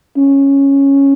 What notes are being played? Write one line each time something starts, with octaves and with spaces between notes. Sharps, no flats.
C#4